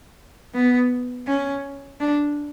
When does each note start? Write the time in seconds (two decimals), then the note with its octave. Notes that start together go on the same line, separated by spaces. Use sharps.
0.54 B3
1.27 C#4
2.00 D4